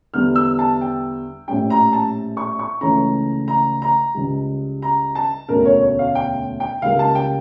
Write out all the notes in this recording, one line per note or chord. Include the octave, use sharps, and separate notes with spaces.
E2 D3 G3 F6
E6
A5
G5
A#1 A2 G3 C#4 G5
A#5
A5
C#6
C#6
C#2 C#3 E3 A3 C#4 A#5
A#5
A#5
C#2 C#3 G3
A#5
A5
E1 D2 D3 A3 C#4 A#4
C#5
C#5
F5
G5
G5
C#2 C#3 G3 A#3 F5
A5
G5